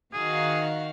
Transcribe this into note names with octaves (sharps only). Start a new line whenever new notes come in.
D#3 F#4 G#4 F5